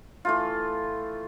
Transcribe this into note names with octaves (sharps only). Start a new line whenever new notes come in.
E3 A3 F4